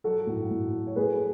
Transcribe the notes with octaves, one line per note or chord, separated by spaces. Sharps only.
F#3 F#4 A4
A2
A2
F#3
C#5
A3 G#4 B4